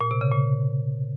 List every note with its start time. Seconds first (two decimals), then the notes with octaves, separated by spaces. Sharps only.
0.01 A#2
0.11 C3
0.21 C#3
0.32 A#2